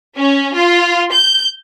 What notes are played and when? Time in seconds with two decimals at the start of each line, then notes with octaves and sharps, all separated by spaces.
0.17 C#4
0.56 F4
1.12 G6